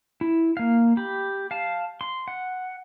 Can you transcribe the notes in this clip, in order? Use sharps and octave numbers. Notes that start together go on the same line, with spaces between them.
E4
A#3 F5
G4 B5
F5 A5
C6
F#5